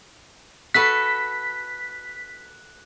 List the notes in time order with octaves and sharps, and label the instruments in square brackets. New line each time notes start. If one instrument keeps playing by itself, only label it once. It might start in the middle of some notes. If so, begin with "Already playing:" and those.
[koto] F#4 A4 B4 [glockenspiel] F#6 [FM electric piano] B6